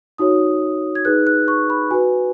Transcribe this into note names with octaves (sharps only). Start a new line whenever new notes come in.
D#4 F#4 C#5 D#6
G#6
D#4 G#4 B4 F#6
F#6
C#6
B5
F#4 B4 G#5